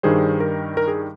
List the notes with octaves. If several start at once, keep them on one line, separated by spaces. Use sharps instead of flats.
G2 D#3 G3 G#4 C5
A#4
A#4
G#4